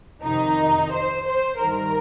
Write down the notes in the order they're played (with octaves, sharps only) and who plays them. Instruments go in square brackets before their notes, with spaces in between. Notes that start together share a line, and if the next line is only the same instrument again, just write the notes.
[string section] F2 C3 D#3 D#4
C5
C5
G2 D#3 A#4